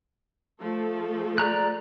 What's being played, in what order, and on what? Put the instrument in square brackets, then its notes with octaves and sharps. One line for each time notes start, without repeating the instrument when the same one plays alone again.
[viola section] F3 A3 A4
[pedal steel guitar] D5 A#5 F#6